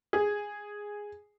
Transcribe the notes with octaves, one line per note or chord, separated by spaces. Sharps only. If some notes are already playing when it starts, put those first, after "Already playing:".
G#4